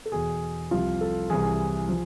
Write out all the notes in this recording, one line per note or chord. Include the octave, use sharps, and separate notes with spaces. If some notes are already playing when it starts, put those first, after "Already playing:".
A4
E2 B2 G#4
C2 C3 F3 F4
A4
C2 C3 E3 G#4
F3